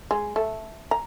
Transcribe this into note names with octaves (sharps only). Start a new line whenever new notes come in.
G#3
A3
A#5